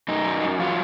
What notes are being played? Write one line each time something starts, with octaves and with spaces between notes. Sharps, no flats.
F#2 D#4
F#3
F#2
F#3 F4